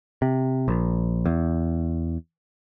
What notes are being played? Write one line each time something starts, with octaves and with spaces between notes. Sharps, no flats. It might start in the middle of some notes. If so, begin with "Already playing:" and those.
C3
A#1
E2